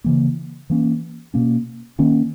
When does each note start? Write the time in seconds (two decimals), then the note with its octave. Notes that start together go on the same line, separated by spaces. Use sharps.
0.04 C#3 E3 A#3
0.70 E3 A#3 C#4
1.34 B2 A#3 C#4
1.99 D#3 A#3 C#4